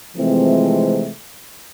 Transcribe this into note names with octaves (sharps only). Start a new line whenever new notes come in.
C3 E3 F3 G#3 A3 C4